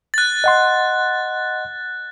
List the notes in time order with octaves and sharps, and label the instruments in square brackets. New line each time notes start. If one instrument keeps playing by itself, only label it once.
[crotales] F#6 A6
[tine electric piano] D#5 F#5 C6